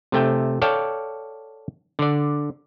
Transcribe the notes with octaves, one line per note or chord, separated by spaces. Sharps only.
C3 A3 G5
A4 C#5 D5 F5 G5 A5
D3 D5